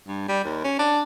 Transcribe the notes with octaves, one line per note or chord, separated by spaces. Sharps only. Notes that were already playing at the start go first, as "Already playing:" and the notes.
G2
G3
D#2
C#4
D4